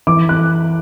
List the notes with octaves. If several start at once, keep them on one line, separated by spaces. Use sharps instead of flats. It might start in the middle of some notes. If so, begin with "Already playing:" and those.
E3 D6
F#6